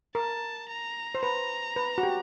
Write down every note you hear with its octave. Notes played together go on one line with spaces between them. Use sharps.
A#4 A5
A#5
C5
B4 A#5
B4
F#4
G4